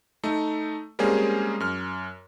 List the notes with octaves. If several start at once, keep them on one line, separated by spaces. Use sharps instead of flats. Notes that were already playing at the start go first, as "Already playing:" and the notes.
A3 D#4
G3 G#3 A#3 C4 C#4 G#4
F#2 F6